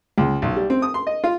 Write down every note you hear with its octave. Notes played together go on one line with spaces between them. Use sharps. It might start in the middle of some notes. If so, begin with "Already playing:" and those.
C#2
B1
G3
C4
D#6
C6
D#5
F4